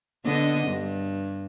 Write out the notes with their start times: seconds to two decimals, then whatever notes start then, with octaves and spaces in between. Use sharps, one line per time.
0.25 D3 B3 D#5
0.67 G2